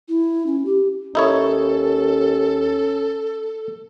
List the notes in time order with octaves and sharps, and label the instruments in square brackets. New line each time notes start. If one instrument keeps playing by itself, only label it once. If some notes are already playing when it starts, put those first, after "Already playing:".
[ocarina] E4
C#4
G4
[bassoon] D#2 [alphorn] C#4 [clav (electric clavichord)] D#4 E4 C#5 [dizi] A4